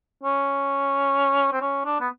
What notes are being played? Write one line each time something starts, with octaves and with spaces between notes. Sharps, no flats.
C#4
C4
C#4
D4
B3